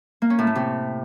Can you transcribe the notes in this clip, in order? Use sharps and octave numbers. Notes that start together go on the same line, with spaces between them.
A#3
C#4
A2
A3
C3